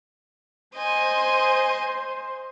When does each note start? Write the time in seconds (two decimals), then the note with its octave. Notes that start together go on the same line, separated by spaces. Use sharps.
0.76 C5 D#5 G#5